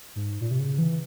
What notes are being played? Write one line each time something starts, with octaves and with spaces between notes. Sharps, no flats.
G#2
A#2
C3
C#3
E3